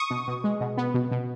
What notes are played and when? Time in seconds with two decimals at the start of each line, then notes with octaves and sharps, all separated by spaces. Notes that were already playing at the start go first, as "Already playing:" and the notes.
Already playing: C#6 D#6
0.10 B2
0.27 B2
0.44 G#3
0.60 B2
0.77 B3
0.94 B2
1.11 B2